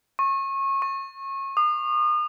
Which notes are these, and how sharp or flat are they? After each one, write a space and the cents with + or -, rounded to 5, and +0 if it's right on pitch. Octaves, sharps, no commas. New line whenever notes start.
C#6 -30
C#6 -30
D#6 -40